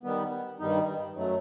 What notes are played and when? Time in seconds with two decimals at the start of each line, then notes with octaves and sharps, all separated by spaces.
0.03 D#3 G3 B3
0.59 G2 D#3 G3 D#4
1.15 F#2 F#3 A3